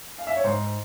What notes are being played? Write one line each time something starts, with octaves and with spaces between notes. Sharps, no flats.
F5
E5
C#5
G#2 C5